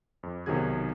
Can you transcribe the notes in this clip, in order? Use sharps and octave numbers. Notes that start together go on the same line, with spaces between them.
F2
B1 C3 D#3 F#3 G#4 G#6